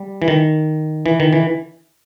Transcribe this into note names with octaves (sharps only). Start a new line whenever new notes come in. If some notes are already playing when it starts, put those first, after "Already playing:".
Already playing: G3
E3
D#3
E3
D#3
E3